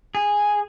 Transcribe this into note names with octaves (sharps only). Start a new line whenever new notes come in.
G#4